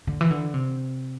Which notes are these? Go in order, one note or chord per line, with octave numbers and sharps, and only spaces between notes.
D3
E3
D3
C3